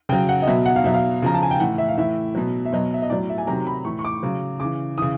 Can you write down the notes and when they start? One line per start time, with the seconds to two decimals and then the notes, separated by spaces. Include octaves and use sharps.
0.09 C#3 F#3 G5
0.29 F#5
0.42 D#5
0.47 B2 F#3 E5
0.66 F#5
0.76 F5
0.84 B2 F#3 E5
0.94 F5
1.22 C#3 F3 A#5
1.34 A5
1.43 G#5
1.51 G5
1.60 A2 E3 F#5
1.78 E5
1.89 F5
1.98 A2 E3 E5
2.35 B2 F#3
2.66 E5
2.72 B2 F#3 D#5
2.94 E5
3.02 D#5
3.10 A2 F#3 D5
3.29 E5
3.38 G#5
3.47 C3 D#3 F#3 A#5
3.67 B5
3.85 A2 E3 C#6
3.99 C#6
4.05 D6
4.23 C#3 F#3
4.60 C#3 E3 D6
4.98 C#3 E3 D#6